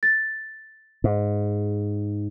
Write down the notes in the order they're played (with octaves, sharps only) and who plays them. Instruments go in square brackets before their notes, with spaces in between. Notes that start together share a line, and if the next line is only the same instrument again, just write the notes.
[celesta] A6
[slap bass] G#2